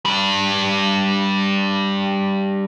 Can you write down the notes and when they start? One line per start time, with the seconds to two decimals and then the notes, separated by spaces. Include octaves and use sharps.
0.05 G3 D4